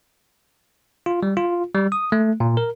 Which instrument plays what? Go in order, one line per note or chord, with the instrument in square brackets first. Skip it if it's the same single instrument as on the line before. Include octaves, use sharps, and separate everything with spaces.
[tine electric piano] F4
G3
F4
G3
D#6
A3
A#2
A#4